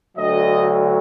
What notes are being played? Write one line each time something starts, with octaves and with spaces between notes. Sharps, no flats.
D2 D3 F#3 D#5